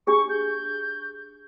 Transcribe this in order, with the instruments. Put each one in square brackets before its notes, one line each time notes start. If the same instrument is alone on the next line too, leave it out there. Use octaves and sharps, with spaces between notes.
[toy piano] D4 G4 G#4 [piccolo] C#6
[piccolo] G6